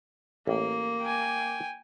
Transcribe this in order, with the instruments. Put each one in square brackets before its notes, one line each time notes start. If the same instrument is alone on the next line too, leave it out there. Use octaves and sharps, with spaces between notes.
[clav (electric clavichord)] A1 [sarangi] A#3
[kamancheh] G5 G#5